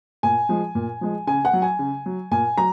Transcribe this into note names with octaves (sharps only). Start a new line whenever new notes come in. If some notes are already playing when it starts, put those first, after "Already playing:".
A#2 G#5
F3 G#3
A#2
F3 G#3
C#3 G#5
F#5
F#3
G#5
C#3
F#3
A#2 G#5
F#3 A#5